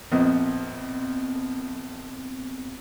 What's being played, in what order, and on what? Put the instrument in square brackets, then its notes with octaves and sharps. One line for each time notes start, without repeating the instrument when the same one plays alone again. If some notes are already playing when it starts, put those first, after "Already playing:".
[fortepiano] A#1 F2 D#5 [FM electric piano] B3 C4